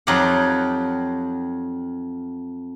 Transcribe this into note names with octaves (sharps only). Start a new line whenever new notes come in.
F2 F#3 D#4 F4 G4 F#5